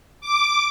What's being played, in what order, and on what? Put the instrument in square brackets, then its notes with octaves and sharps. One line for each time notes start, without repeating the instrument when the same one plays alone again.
[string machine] D6